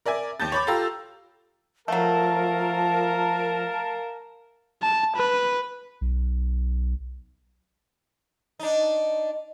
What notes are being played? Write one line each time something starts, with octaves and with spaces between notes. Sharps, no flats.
A#4 D5 E5 G#5
D#2 A5 G6 A6
C#5 B5 D6
F4 G4 A4 F5 A#5 E6
F3 F#3 A3 A#4 F5 A5
A5
B4
B1
D4 D#4